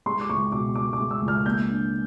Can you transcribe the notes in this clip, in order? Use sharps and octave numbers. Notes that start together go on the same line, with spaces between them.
G#3 C6
D6
C#2 C#6
B2 D6
G#3 D6
D6
G#3
E6
C#2
F6
A#3 G6
D4